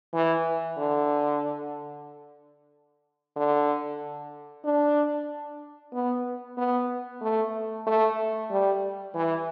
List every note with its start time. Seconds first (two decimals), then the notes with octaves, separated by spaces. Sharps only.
0.14 E3
0.77 D3
3.36 D3
4.64 D4
5.93 B3
6.58 B3
7.22 A3
7.87 A3
8.51 G3
9.15 E3